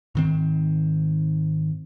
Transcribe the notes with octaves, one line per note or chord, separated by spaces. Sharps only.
G#2 D#3 C4